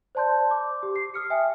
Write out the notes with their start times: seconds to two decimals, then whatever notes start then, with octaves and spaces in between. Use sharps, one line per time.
0.15 C5 D5 A5 C6 G6
0.51 D6
0.83 G4
0.96 C7
1.14 D#6 F6 C#7
1.30 E5 G5 G#5